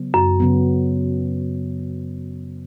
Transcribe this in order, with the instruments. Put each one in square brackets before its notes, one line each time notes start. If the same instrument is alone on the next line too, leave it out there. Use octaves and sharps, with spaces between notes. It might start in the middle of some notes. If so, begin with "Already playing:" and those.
Already playing: [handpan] C#3 F#3 B3
[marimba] F#2
[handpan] C#3 F#3 B3